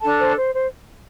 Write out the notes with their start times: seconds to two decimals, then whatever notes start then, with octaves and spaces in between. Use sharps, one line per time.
0.02 D4 A4 A5
0.20 C5
0.36 C5
0.53 C5